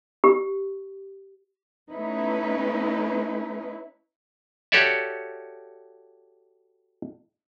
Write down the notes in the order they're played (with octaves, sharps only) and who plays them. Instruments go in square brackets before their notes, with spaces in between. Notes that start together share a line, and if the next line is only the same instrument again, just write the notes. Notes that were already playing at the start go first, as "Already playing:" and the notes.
[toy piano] G4
[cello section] A3 B3 C#4 D#4 E4 B4
[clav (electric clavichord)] F#4 G4 A4 C#5 D5 E5